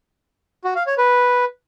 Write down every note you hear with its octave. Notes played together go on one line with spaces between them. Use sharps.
F#4
F5
C#5
B4